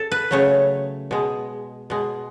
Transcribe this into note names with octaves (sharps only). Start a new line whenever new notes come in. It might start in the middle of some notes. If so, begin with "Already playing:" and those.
Already playing: A4
B4
C#3 F#3 A3 C#5
B2 G#3
B2 G#3